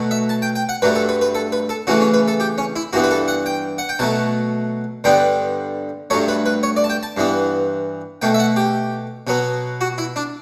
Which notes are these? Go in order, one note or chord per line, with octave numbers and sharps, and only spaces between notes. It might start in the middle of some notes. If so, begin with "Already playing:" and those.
Already playing: B2 F#3 A3
E5
A5
G5
G5
F#5
G2 F#3 A3 B4
A4
B4
B4
A4
B4
A4
C#3 E3 A3 F#4
C#4
B4
A4
G4
C#4
E4
G2 E3 B3 F#4
B4
A4
F#5
G5
F#5
G5
B2 F#3 A3 A5
G2 D3 G3 B3 G5
G2 F#3 A3 C#5
B4
B4
C#5
D5
A5
G5
A5
G2 E3 B3
B2 A3 G5
E5
F#5
G4
B2 F#3 B3
F#4
E4
D4